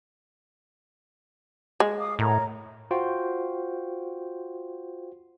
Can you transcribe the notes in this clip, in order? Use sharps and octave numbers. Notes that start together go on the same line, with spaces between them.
G#3
F5 D6 D#6
A2 A#4 C#5 A#5
F4 F#4 C5 G5